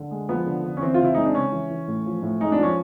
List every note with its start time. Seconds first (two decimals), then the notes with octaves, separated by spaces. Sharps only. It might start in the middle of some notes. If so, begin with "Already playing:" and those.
Already playing: D3
0.11 G#3
0.29 F3 B3
0.46 D3
0.64 D3
0.77 C#4
0.81 E3 C4
0.94 C#3 F4
1.04 E4
1.14 G#3 D#4
1.25 D4
1.35 C#3 C#4
1.52 E3
1.70 E3
1.88 A2
2.06 F3
2.22 A2
2.40 G#3 D#4
2.52 D4
2.58 F3 C#4